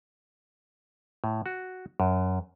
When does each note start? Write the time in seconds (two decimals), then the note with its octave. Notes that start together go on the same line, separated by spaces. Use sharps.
1.24 A2
1.46 F#4
2.00 F#2